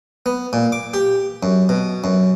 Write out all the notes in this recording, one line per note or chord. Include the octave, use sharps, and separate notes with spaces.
B3
A#2
D6
G4
F#2
B2
F#2